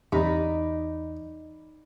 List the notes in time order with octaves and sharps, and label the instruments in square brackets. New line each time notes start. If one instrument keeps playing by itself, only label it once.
[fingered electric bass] E2 E3 [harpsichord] C3 [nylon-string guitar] D#4 [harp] D5 A#5 B5